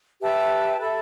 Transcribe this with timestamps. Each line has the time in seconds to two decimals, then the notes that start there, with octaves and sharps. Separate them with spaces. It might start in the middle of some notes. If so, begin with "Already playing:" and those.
0.21 G4 B4 E5 A5
0.80 A4 E5 B5